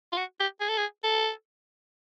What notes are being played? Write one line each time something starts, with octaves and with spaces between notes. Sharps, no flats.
F4
F#4
G4
G#4
A4
G#4
A4